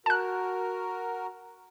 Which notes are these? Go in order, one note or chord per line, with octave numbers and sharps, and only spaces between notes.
F#4 A#4 A5 F#6